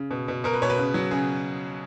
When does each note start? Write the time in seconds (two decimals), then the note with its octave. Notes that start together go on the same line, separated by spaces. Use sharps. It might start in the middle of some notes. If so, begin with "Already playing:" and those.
Already playing: C#3
0.11 B2
0.28 B2
0.44 B2 A#4
0.54 B4
0.62 B2 C#5
0.70 B4
0.78 C#3
0.94 F#3
1.11 C#3 G#4